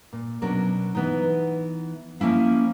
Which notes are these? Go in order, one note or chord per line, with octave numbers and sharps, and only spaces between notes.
A#2
B2 F#3 C#4 D4 A#4
E3 B3 D#4
F3 A#3 C#4 E4 F5